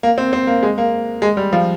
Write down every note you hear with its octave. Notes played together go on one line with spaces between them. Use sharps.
A#3
C4
C4
A#3
G#3
A#3
G#3
G3
F3